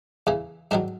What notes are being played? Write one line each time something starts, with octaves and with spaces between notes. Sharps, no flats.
E2 C#3 E3
G#2 D#3 F#3 D4